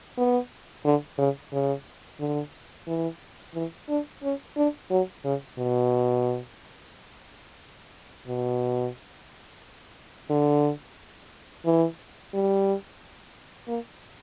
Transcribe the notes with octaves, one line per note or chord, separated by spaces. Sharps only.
B3
D3
C#3
C#3
D3
E3
E3
D4
C#4
D4
F#3
C#3
B2
B2
D3
E3
G3
A#3